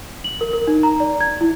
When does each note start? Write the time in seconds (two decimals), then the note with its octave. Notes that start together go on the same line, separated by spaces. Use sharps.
0.24 F#7
0.41 A#4
0.53 A#4
0.67 D#4
0.83 A#5
1.00 D5
1.21 G#6
1.41 E4